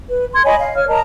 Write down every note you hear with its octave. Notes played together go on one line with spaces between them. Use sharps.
B4
C6 G#6
C#5 D#5 G#5 B5
F5
C#5 F6
A#4 D#5 A5 A#5